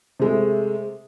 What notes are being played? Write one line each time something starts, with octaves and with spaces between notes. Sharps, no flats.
C3 G#3 A3